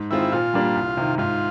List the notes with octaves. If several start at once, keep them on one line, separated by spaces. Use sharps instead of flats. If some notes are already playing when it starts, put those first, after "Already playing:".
Already playing: G#2
D#3 G#3 C4 E4 F4
A#2 F4
G3 A#3 D4 G4
C2
C3 D#3
G#2 F4